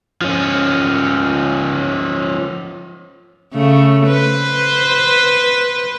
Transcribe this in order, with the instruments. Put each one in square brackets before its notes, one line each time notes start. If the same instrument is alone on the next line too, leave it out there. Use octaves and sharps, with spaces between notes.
[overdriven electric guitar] F3 C#4
[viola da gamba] C#3 A3
B4 C5